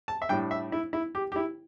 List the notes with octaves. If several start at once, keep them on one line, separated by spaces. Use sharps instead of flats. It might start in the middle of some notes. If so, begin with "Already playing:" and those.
A5
E5
A2 G3 D4 G5
E5
E4
E4
G4
G4
E4